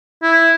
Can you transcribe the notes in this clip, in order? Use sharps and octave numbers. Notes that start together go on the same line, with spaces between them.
E4